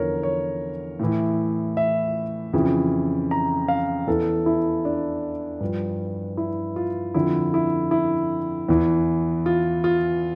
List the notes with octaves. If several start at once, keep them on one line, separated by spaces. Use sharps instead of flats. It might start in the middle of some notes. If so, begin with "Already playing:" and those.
Already playing: E2 D3 F3 A#4 C#5
C#5
A2 E3
E5
F2 C#3 E3
A#5
F5
E2 E3 A4
E4
D4
G2 F3
E4
F4
F2 D3 F3 E4
E4
E4
E2 E3
F4
F4